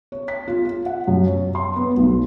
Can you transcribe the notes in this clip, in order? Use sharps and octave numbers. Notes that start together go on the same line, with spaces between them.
C#5
B6
F4
F4
F#5
F#2
C#5
C6
B3
B1